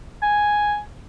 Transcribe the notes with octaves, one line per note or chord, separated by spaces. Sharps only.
G#5